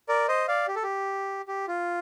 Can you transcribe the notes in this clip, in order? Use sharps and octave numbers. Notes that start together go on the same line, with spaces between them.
A#4 D5
C5 D#5
D5 F5
G4
A4
G4
G4
F4